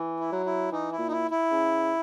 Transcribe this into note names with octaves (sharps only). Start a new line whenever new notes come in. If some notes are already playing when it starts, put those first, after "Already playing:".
Already playing: E3
E4
F#3
E4
E3 D#4
E4
A#2
D#4
E4
E4
C#3